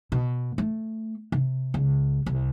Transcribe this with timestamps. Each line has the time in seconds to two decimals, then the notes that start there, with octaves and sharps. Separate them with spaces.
0.12 B2
0.58 A3
1.32 C3
1.74 C#2
2.26 C2